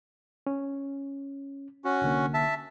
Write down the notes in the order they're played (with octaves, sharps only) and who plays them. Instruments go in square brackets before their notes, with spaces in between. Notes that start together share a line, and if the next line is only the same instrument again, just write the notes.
[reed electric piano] C#4
[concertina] C#4 F#4
[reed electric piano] C2 D3 A#3
[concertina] E5 A5